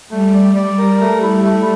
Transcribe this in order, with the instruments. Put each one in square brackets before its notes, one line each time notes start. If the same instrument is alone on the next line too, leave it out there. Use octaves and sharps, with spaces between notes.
[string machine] G3 [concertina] A3
[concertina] D5
D5
A#4
A3
E4
A3